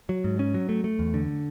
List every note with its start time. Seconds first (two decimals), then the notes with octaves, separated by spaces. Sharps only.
0.09 F#3
0.24 G#2
0.39 C#4
0.54 F#3
0.69 A3
0.84 A3
0.99 E2
1.14 D3